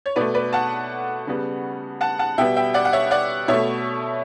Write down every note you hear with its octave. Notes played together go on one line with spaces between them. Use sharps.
C#5
B2 A3 B4 D5
B4 D5
F#5 A5
C#3 G3 B3
F#5 A5
F#5 A5
B2 G3 B3 E5 G5
E5 G5
D5 F#5
F#5
C#5 E5
D5 F#5
B2 A3 C#5 E5